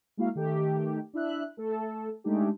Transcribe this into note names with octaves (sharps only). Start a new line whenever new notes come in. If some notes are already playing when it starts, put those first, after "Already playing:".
G#3 A#3 E4 F#4 F5
D#3 A3 G4
D4 E4 E5 F#6
A3 A4
G#3 A3 D4 D#4 G4